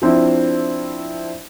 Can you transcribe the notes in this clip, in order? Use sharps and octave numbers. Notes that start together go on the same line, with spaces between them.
F3 C4 D4 E4